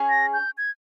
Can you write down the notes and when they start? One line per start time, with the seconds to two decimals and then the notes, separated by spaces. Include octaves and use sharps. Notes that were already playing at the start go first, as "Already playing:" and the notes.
Already playing: C#4 G#4 C#5
0.09 A#6
0.33 G6
0.58 G#6